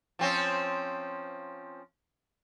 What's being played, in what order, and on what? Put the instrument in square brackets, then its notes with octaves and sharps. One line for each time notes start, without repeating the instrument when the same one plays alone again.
[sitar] F3 C4 C#4